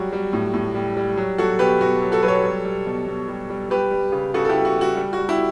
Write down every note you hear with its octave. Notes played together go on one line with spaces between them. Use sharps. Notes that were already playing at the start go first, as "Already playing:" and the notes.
Already playing: F#3 G3 F#4
G3
A2
A2
G3
G3
F#3
F#3 F#4 A4
B2 G4 B4
B2 F#4
F#3
F#4 A4
F#3 B4
A4 C#5
G3
G3
B2
B2
G3
G3
G3 G4 B4
G3
C#3
C#3 F#4 A4
A4
E4 G4
G3
F#4
G3
F#4
G3
F#4
G3
E4 G4